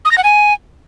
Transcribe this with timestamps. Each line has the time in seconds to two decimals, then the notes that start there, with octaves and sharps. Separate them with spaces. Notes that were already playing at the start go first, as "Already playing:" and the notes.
0.05 D#6
0.11 A#6
0.17 F#5
0.24 G#5